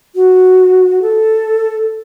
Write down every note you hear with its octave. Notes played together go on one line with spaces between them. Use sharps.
F#4
A4